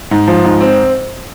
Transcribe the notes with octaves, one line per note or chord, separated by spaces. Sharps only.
G#2
F3
G#2
C4